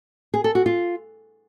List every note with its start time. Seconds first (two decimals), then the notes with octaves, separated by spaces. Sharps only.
0.34 G#4
0.44 A4
0.55 F#4
0.66 F4